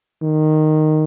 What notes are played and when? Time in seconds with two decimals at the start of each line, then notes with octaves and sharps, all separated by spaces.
0.23 D#3